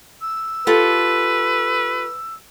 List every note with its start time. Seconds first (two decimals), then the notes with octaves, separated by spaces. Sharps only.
0.20 E6
0.67 F4 G4 A4 B4